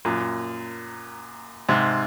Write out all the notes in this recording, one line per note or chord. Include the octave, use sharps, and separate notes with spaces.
F#2 A#2
G#2 C3